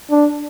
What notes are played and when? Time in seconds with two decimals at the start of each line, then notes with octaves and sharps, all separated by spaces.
0.11 D4